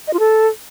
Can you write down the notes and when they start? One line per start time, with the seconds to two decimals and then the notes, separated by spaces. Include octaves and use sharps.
0.07 D#5
0.13 F4
0.19 A4